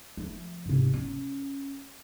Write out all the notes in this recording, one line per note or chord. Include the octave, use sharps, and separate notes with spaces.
F3 A3
G#2 C3
C#4